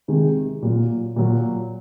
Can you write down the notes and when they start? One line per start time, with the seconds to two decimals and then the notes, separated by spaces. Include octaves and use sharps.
0.08 C3 D#3 G#3
0.62 A#2 F#3 A#3
1.16 A#2 F#3 A#3